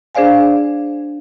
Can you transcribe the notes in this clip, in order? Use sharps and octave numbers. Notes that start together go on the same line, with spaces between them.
D4 G#4 C5 D5 F5 G#5